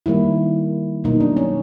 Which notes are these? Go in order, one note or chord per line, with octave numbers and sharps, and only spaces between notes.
D#3 G3 A#3 E4
B2 F#3 A#3 D#4
D4
C#4